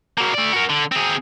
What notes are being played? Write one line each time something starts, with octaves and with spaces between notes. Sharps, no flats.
F#3 A#3
A3 D5
F#4 A#4
D3
C4 G#4